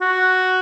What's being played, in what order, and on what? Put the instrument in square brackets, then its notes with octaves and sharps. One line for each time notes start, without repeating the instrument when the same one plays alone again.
[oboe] F#4